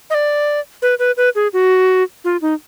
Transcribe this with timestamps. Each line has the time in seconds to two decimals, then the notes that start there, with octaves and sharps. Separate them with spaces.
0.10 D#5
0.14 D5
0.82 B4
0.99 B4
1.17 B4
1.35 G#4
1.53 F#4
2.24 F4
2.42 D#4